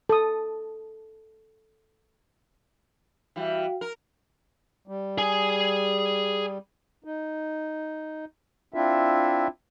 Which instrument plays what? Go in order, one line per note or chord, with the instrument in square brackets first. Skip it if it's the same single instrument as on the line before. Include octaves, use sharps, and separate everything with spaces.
[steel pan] A4 D#6
[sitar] E3 G3 [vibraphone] F#4 F5 G5
[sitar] A#4
[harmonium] G3
[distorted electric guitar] G#4 G#5
[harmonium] D#4
C4 D4 E4 F4 E5